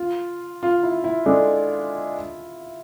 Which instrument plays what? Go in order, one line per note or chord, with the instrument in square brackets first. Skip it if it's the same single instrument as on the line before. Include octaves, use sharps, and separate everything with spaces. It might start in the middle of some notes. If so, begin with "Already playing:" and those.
Already playing: [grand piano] F4
F4
E4
E4
[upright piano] G#3 D4 A4